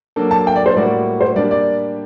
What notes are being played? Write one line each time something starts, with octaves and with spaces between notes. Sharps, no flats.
F#3 A#3 D4 A4
A5
G5
D5
C5
A2 G3 A#3 F#4 D5
C5
G3 A#3 D4 G4 D5
D5